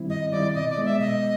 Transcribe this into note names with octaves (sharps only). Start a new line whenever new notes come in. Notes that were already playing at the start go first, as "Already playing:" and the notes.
Already playing: D#3 G3 C4 E4
G2 D#5
D#3 G3 C4 E4 D5
B2 D#5
D5
G#3 B3
E5
B2 D#5